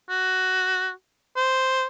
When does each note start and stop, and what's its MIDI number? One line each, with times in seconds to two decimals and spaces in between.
0.10 0.90 66
1.37 1.87 72